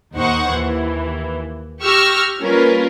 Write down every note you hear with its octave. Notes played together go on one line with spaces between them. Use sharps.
D#2 D#4 C5 F#5 C#6
D#2 E3
G4 C#6 E6 F6 A#6
G3 A#3 C#4 F4 A#4 B4